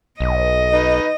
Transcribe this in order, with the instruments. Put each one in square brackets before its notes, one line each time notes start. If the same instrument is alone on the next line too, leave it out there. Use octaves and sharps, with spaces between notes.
[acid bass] B1 [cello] D#5
[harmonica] D#4 B4